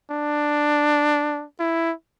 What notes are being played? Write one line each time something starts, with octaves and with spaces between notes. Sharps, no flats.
D4
E4